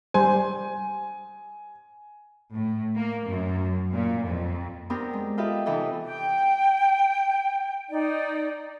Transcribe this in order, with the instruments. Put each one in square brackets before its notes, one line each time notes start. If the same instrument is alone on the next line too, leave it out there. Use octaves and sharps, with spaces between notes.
[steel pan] G3 C5 [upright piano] G#5
[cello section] A2
A#3
F#2
A#2
F2
[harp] B3 C4 D4 G4 A#4
G#3
F4 G4 A4 B4 D#5 E5
C3 E3 D#4 G4 A4
[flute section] G5
D#4 D5